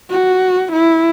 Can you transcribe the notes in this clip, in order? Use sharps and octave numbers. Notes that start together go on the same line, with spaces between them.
F#4
E4